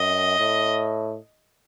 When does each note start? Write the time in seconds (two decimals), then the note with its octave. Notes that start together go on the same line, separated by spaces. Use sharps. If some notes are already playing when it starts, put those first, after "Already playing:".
Already playing: F#2 D#5
0.39 A2